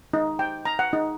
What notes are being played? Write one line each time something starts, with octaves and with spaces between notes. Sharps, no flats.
D#4
G5
A#5
F#5
D#4